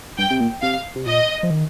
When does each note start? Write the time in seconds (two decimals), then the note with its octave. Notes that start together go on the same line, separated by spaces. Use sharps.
0.18 G2 G5
0.30 C3
0.40 A#2
0.62 C3 F5
0.96 C3
1.06 A#2 D#5
1.43 F3
1.50 D#3